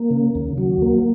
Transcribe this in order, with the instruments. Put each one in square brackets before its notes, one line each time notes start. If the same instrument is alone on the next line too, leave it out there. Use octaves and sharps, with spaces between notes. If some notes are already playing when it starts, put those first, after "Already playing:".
Already playing: [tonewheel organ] A#3
C#3
D#2
F#3
A#3